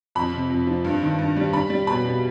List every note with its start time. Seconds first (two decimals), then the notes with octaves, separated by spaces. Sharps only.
0.15 F2 B5
0.33 C3
0.50 F2
0.67 F3
0.85 G2
1.02 D#3
1.19 G2
1.36 G3
1.53 G3 B5
1.70 G3
1.87 B2 B5
2.05 B2